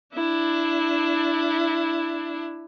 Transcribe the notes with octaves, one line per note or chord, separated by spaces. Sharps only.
D4 E4